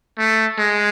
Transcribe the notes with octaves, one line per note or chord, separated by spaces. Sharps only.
A3
G#3